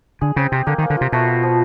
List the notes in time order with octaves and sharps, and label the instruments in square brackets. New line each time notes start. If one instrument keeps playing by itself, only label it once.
[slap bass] D3 [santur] G#4
[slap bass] C#3 [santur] C4
[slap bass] C3 [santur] C4
[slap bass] D3 [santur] A#3
[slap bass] D#3 [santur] A#3
[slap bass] D3
[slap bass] C3 [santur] F4
[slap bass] B2 [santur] A3
[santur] F4
F3